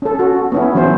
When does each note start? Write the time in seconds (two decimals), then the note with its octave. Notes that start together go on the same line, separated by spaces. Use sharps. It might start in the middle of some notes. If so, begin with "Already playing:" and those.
0.02 C#4 A4
0.19 F#4
0.52 B3 C#4 E4
0.75 E3 F#3 C#4 E4 C5